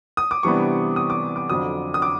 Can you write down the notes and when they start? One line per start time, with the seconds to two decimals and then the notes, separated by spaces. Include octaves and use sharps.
0.17 D#6
0.31 D6
0.43 C3 E3 G3 B3 D4 C#6
0.96 D#6
1.10 D6
1.36 D6
1.50 F2 D3 F#3 D#6
1.94 D#6
2.02 D6